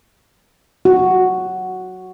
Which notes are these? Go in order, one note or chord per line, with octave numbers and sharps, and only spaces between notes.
F#4